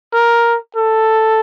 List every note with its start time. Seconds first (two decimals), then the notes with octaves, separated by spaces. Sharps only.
0.13 A#4
0.76 A4